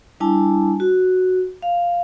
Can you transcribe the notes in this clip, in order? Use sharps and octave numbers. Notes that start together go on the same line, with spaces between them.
G3 D4 E4 G#5 A5
F#4
F5